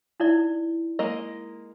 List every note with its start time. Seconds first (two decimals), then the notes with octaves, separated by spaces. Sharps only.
0.20 D#4 E4 D5
0.99 G#3 A#3 D#5